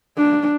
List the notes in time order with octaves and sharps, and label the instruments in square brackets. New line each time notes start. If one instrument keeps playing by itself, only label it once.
[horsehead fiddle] D4